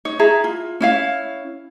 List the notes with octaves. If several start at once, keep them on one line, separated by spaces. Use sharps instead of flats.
D#4 C#5
E4 G#4 A#5
F4
C#4 E4 F5